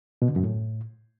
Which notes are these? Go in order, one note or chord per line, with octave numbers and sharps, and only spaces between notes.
B2
D3
F#2
A2